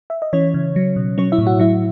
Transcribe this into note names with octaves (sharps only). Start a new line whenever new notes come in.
E5
D#5
E3 C#4 C#5
C#3
F#3
B2
F#3 C#4 C#5
E4 E5
A2
F#4 F#5
F#3 E4 E5